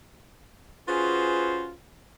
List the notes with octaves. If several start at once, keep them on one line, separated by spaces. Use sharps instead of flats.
C#4 F4 F#4 G#4 B4 C5